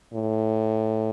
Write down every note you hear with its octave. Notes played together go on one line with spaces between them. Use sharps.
A2